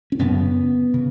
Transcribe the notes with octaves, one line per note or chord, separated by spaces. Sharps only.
C#4
F#2 C#3 B3
C#3